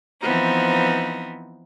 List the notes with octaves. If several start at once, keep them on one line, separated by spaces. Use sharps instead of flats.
E3 F3 B3 C4 D#4